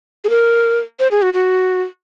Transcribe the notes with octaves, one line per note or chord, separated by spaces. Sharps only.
G#4
A#4
C5
G#4
F#4
F#4